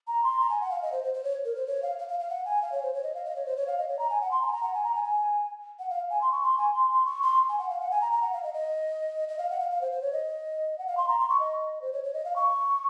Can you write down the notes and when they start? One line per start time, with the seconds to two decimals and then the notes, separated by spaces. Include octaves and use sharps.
0.08 A#5
0.23 C6
0.40 A#5
0.49 G#5
0.61 F#5
0.71 F5
0.82 D#5
0.92 C5
1.04 C5
1.14 C5
1.24 C#5
1.45 A#4
1.56 C5
1.67 C#5
1.83 F5
1.99 F5
2.09 F5
2.20 F5
2.30 F#5
2.45 G#5
2.62 F5
2.72 C#5
2.83 C5
2.94 C#5
3.03 D#5
3.15 F5
3.25 D#5
3.36 C#5
3.46 C5
3.57 C#5
3.67 F5
3.78 D#5
3.88 C#5
3.99 A#5
4.10 G#5
4.21 F#5
4.31 C6
4.42 A#5
4.47 G#5
4.53 A#5
4.63 F#5
4.74 G#5
4.84 A#5
4.95 G#5
5.05 G#5
5.79 F#5
5.90 F5
6.10 G#5
6.21 C6
6.32 C#6
6.43 C6
6.58 G#5
6.74 C6
6.90 C6
7.06 C#6
7.22 C6
7.49 G#5
7.58 F#5
7.69 F5
7.81 F#5
7.91 G#5
8.01 A#5
8.12 A#5
8.22 F#5
8.33 F5
8.43 D#5
8.54 D#5
9.29 D#5
9.38 F5
9.50 F#5
9.60 F5
9.71 F5
9.81 C5
9.92 C5
10.02 C#5
10.13 D#5
10.79 F#5
10.87 F5
10.97 C6
11.08 A#5
11.19 C6
11.29 C#6
11.40 D#5
11.82 C5
11.93 C#5
12.04 C#5
12.14 D#5
12.25 F5
12.36 C#6